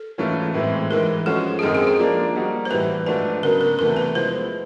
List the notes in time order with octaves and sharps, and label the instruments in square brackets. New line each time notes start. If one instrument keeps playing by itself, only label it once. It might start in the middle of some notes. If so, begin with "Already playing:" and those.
Already playing: [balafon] A4
[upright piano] G#2 E3 A3 C#4 F4
A2 E3 G#3 C4
[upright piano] G#2 E3 G#3 [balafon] A#4
[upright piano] F3 G#3 C#4 F#4 [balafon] A4
[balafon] G#4
[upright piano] F#2 D#3 G#3 C4 D#4 [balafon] A4
[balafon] G#4
G#4
[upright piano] F3 A#3 D4
G3 A#3 D#4 F#4
[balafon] C5
[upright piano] A2 E3 G3 [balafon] B4
[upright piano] G#2 F3 A3 D4 F#4 [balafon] B4
[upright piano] C#3 F#3 B3 D4 [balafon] A#4
[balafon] A#4
[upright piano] E2 C3 E3 A3 [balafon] A#4
[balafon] B4
[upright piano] F3 G#3 B3 E4 [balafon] C5